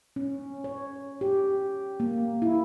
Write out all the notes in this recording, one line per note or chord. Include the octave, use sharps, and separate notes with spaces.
C#4
C#5
G4
A#3
E4